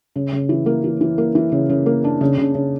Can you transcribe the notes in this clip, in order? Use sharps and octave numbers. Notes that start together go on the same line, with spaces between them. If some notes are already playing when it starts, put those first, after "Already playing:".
C#3
C#3
E3
A#3
E3
E3
A#3
E3
C#3
C#3
A#3
D4
C#3
C#3
C#3